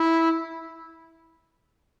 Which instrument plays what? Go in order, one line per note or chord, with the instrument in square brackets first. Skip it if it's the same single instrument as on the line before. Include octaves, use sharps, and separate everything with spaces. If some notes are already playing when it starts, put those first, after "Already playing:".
Already playing: [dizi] E4